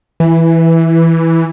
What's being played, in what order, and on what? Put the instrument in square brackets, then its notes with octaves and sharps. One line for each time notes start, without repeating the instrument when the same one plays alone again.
[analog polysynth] E3